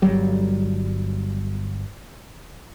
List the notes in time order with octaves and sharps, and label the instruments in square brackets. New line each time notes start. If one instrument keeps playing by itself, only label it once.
[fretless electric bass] G1 F#3 G3